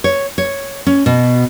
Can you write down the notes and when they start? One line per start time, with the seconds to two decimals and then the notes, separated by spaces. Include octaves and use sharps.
0.04 C#5
0.38 C#5
0.87 C#4
1.06 B2